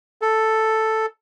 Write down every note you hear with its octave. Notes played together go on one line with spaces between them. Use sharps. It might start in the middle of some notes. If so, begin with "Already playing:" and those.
A4